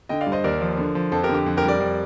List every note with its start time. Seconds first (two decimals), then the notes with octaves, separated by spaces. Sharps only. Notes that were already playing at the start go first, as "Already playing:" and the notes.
0.09 D3 D#5 G5
0.21 D5 F5
0.26 G2
0.32 C5 D#5
0.44 D#2 A#4 D5
0.61 F3
0.78 D3
0.95 F3
1.12 F2 A4 C5
1.23 G4 A#4
1.29 D3
1.34 G4
1.46 F2
1.57 G4 A#4
1.63 G3
1.68 A#4 D5
1.80 F2